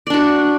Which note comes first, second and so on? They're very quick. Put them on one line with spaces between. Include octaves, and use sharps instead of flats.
D5 D4 F#4